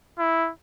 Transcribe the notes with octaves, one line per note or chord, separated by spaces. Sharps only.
E4